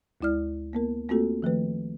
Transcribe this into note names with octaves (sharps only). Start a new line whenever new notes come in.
D2 G#3 E4 D5 F6
A#3 B3 A#4
A3 A#3 C4 F4 F#4 A4
D#3 F3 A3 B4